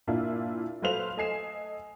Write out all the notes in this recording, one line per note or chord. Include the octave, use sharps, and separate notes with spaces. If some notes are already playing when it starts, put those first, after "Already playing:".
A#2 A#3 D4 E4 F4
F#3 A3 B4 C5 F5 F7
A3 D#5 G#5 C7 E7